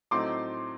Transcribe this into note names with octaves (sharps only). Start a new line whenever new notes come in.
A2 F#3 A3 C4 D#4 C6 D6